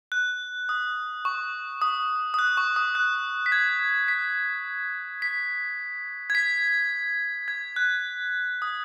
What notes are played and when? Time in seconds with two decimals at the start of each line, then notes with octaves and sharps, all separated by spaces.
0.12 F#6
0.69 D#6
1.25 C#6
1.82 D#6
2.34 D#6
2.39 F#6
2.57 C#6
2.76 D#6
2.95 F#6
3.46 B6
3.52 G#6
4.08 B6
5.22 B6
6.30 G#6
6.35 B6
7.48 G#6
7.76 F#6
8.62 D#6